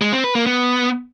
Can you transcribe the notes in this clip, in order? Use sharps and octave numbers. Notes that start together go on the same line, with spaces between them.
G#3
C4
B4
A#3
B3